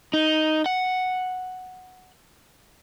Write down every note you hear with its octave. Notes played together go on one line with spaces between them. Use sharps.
D#4
F#5